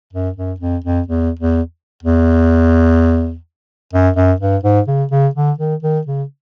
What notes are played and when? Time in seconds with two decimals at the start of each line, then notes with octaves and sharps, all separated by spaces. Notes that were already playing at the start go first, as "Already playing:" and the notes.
0.13 F#2
0.36 F#2
0.60 F2
0.84 F2
1.08 E2
1.40 E2
2.03 E2
3.93 F#2
4.16 F#2
4.41 G2
4.64 G#2
4.87 C#3
5.11 C#3
5.35 D3
5.58 D#3
5.83 D#3
6.07 C#3